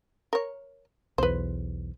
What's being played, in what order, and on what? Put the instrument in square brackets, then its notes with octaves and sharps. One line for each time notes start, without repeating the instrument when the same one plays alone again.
[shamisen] A#4 C#5
[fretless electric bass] B1 E2 [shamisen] B4 C5